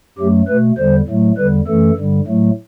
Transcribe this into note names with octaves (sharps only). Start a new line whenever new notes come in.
F#2 F#3 A3 G4
B2 A3 B4
E2 D3 G3 C5
A2 F#3 A3
E2 D3 G3 B4
F#2 E3 A3 A4
G2 D3 G3
A2 F#3 A3